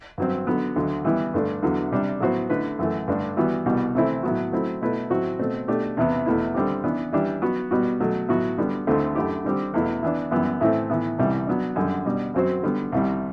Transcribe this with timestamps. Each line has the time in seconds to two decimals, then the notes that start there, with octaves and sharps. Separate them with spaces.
0.18 G2 F#3 C4
0.47 D3 F#3 B3
0.76 D2 D3 F#3
1.05 E3 G3 B3 E4
1.34 G2 D3 A3 D4
1.62 E2 D3 F#3 B3
1.92 C3 G3 D4
2.21 A2 F#3 B3 F#4 C5
2.49 D3 A3 E4 B4
2.79 F#2 E3 A3
3.08 G2 D3 A3 D4
3.37 E3 G3 B3 F#4
3.66 C2 B2 G3 B3 F#4
3.95 C3 E3 A3 C4 E4
4.23 A2 F#3 B3 F#4
4.52 F#3 A3 C4 E4
4.82 B2 A3 E4 B4
5.10 A2 F#3 C4 F#4
5.39 B2 A3 C4
5.68 B2 A3 D4 G4
5.97 E2 C3 E3 B3 E4
6.26 E2 B2 A3 E4
6.55 D3 G3 C4 G4
6.84 E3 B3 D4
7.13 E3 G3 D4 G4
7.42 F#3 B3 F#4
7.71 B2 G3 B3 F#4
8.00 B2 F#3 A3
8.29 A2 F#3 B3 F#4
8.58 D3 G3 B3 D4
8.87 D2 D3 A3 C4 E4
9.15 F#2 D3 A3 E4 G4
9.44 D3 G3 C4 G4
9.74 E2 B2 A3 E4
10.03 E3 B3 D4
10.31 F#2 E3 G3 B3
10.61 A2 E3 A3 C4
10.90 A2 E3 B3
11.18 C2 C3 E3 G3
11.47 F#3 B3 D4
11.76 F#2 D3 G3
12.05 B2 G3 D4
12.34 F#2 F#3 C4 F#4 C5
12.63 D3 G3 B3
12.92 C2 C3 G3